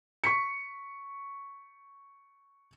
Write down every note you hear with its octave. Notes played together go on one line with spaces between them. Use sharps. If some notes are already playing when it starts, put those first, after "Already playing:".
C#6 B6 C#7